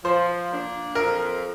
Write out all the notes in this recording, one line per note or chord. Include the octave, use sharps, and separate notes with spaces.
F3 C5
A#3 D4
F2 A#4